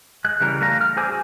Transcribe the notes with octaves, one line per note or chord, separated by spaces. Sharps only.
G#3 F#6
C#3 E3 G3 A#4
G3 A3 F5 A#5
F6
G#4 C5 G#5 D6 E6
F#4 G#4